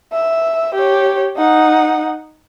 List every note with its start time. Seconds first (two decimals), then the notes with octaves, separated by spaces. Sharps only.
0.13 E5
0.74 G4 C#5
1.37 D#4 F#5